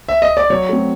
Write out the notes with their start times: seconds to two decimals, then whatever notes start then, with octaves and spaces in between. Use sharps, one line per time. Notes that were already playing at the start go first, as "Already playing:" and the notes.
0.09 E5
0.22 D#5
0.37 D5
0.50 F#3 C#5
0.69 A3 C4